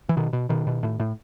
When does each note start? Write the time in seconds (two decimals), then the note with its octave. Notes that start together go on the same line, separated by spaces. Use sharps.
0.09 E3
0.17 B2 D#3
0.33 B2
0.49 B2 D#3
0.67 B2
0.83 A2
1.00 A2